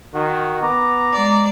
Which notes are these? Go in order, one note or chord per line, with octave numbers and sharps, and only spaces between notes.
D#3 F#4
B3 A#5 D6
G#3 D5